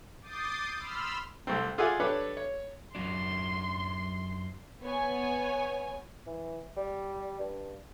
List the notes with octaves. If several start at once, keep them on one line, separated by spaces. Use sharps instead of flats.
D6 D#6 G6 A6 C7
B5 C6 E6 F6
C2 C3 A3 C4
F4 G#4 D5 E5 F#5 G#5
D4 G4 A4 B4 C#5 D5
C#5
F#2 F#3 D4 C6
B3 C#5 G#5
E3
G3
G2